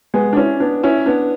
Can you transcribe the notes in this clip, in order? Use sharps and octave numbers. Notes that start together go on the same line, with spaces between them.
G#3 B3
D4
C#4 E4
B3 D4
C#4 E4
B3 D4